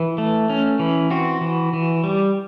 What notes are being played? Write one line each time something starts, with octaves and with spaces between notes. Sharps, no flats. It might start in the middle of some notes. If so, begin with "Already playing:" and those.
Already playing: E3
A3
C#4
E3
C4 F#4
E3
E3
G3